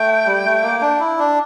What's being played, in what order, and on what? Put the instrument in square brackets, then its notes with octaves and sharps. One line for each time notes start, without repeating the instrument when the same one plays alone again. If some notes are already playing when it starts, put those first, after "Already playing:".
Already playing: [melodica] A3 [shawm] G5
[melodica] G3
A3
A#3
D4
E4
D4